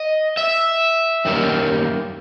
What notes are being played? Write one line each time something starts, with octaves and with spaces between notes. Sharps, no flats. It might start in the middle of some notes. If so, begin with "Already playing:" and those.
Already playing: D#5
E5
F#2 D#3 G3 A#3